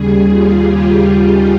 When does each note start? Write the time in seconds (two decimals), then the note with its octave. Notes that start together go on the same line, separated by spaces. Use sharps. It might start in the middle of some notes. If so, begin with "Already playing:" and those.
Already playing: D#2 C#3 G3 G#4
0.29 F4
0.67 G4
1.06 G#4